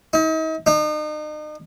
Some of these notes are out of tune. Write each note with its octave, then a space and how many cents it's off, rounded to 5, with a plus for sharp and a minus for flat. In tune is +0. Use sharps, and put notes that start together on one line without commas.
D#4 +40
D#4 -40